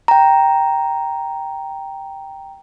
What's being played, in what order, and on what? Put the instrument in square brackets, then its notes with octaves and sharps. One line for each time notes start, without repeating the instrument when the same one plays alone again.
[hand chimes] G5 A#5